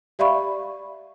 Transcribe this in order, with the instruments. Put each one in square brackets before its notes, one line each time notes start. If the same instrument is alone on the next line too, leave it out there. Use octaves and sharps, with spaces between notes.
[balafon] G4 D5 E5 F5 B5 C#6